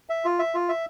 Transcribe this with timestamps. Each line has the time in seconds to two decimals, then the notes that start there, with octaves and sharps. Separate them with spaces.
0.09 E5
0.25 F4
0.39 E5
0.55 F4
0.69 E5